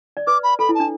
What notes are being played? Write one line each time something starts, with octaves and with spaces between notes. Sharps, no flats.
D5
B4 D6
B5
A4 B5
E4
A5
D4